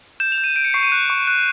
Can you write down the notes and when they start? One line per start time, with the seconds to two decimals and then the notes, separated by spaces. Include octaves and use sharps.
0.20 G6 E7
0.32 F7
0.38 G6
0.44 D#7
0.56 G6 D7
0.64 C#7
0.74 C#6 C7
0.83 D#7
0.92 F#6
1.10 C#6
1.27 F#6